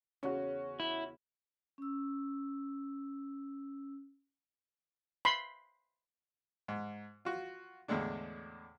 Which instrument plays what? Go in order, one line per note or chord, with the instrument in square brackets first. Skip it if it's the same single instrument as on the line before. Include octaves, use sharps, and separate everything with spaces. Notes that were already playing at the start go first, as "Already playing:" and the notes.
[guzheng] E2 C#3 [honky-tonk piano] C#4 F#4
[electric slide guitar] E4
[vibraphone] C#4 E6
[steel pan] B5 C6
[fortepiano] G#2
F4 F#4
E2 A2 D3 G#3 D4